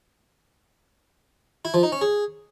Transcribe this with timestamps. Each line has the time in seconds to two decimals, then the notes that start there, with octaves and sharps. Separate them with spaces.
1.65 E4
1.74 F3
1.83 D#4
1.92 C#4
2.01 G#4